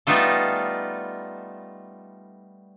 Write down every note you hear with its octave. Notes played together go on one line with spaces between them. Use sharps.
G3 A3 B3 D#4 F4 A4